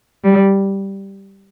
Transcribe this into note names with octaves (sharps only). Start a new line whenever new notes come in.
G3